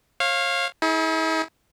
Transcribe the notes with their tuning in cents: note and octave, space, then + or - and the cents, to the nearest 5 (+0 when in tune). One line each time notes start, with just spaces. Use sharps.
C#5 -35 F5 +0
E4 -45 G#4 +25